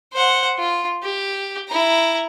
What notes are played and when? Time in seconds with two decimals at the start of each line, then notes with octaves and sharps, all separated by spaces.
0.13 C5 F#5
0.58 F4
1.03 G4
1.68 E4 A#5